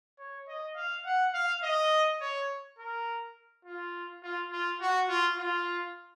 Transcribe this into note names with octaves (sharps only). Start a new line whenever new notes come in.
C#5
D#5
F5
F#5
F5
D#5
C#5
A#4
F4
F4
F4
F#4
F4
F4